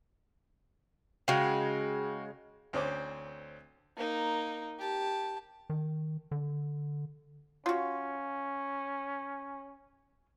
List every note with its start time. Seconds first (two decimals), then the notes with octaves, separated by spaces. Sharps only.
1.28 C#3 G#3 F#4 F5 G5
2.73 D2 C4 C#4 C5 D6
3.96 A#3 D#4
4.78 G4 A5
5.70 D#3
6.31 D3
7.66 C#4 F4 F#4